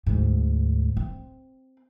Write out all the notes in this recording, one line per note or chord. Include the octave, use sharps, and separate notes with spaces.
D2 G#2
C4